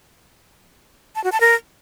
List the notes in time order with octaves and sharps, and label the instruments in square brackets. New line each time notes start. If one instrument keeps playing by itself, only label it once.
[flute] A5
F#4
A5
A#4